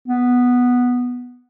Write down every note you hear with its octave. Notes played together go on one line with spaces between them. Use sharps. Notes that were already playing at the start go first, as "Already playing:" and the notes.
B3